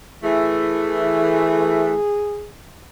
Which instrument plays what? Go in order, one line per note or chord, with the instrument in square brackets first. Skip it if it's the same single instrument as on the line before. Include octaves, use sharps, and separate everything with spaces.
[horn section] E3 A3 [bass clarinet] G#4